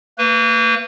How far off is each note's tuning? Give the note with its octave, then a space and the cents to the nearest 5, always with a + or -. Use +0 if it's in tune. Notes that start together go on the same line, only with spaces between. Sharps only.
A#3 -35 B4 +0